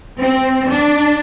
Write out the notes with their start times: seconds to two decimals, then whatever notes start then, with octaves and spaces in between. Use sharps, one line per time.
0.19 C4
0.68 D4